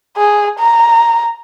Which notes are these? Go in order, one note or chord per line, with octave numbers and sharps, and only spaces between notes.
G#4
A#5